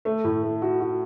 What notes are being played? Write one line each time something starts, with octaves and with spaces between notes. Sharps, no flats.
A3
A2
A3
F#4
F#4